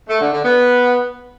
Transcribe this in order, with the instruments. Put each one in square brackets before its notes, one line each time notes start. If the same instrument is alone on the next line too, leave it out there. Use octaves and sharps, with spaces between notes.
[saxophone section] A3
D3
D3
B3